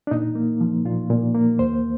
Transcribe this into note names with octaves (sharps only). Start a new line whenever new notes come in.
D4
A#2 D#4
A#3
F3
A#2 F4
A#2
A#3
D#2 C5